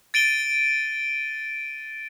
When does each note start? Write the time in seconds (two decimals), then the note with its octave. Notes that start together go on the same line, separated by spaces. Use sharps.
0.14 A6 D7 D#7 G7